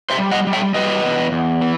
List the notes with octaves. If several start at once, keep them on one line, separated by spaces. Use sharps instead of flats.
C5 E5
G3
D#5 F#5
G3
E5 G5
G3 B4 D#5
E2
E2
E3